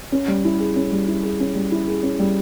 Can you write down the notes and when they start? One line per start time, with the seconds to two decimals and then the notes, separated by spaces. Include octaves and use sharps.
0.12 C#4
0.28 G3
0.45 E4
0.60 G#4
0.76 C#4
0.92 G3
1.08 E4
1.23 G#4
1.40 C#4
1.55 G3
1.72 E4
1.88 G#4
2.03 C#4
2.19 G3